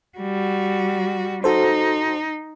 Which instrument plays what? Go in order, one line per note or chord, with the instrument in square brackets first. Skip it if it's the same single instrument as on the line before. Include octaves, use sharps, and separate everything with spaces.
[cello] G3 F#4
[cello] D#4 [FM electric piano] F#4 A4 C5